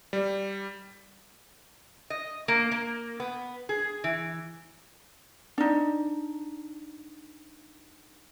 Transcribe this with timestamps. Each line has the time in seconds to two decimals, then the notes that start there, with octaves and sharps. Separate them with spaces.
0.13 G3
2.10 D#5
2.48 A#3
2.71 A#3
3.20 B3
3.69 G#4
4.04 E3
5.58 D4 D#4